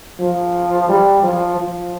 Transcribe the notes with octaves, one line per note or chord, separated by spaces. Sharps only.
F3
G3
F3
F3